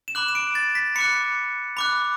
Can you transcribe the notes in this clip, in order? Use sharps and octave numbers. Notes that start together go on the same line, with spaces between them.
E7
B5 D6 F#6 F#7
E7
D7
A6
B6
B5 D6 F#6 C#7
B5 D6 F#6